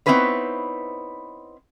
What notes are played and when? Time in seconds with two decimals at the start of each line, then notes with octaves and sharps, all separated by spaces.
0.06 B3 C4 D#4 E4 B4 C#5